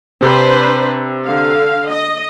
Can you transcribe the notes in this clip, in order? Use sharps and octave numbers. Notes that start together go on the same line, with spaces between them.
C3 C4 D4 B4 C5
D3 F5
D#5